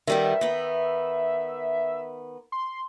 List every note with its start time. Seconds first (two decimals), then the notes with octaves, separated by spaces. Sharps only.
0.07 D#3 G3 B3 E5
0.41 D#3 B3
2.52 C6